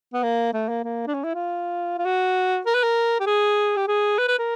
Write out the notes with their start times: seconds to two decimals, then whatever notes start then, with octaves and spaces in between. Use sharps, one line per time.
0.13 B3
0.23 A#3
0.53 A3
0.69 A#3
0.84 A#3
1.07 D4
1.14 C#4
1.24 E4
1.35 F4
1.99 F4
2.05 F#4
2.66 A#4
2.75 B4
2.83 A#4
3.20 G4
3.27 G#4
3.77 G4
3.88 G#4
4.18 B4
4.28 B4
4.39 A#4